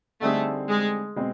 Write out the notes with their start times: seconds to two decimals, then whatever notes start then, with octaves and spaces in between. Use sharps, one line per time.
0.21 D3 G3 A3 C4 D#4 G#4
0.69 G#3
1.16 B2 G#3 C4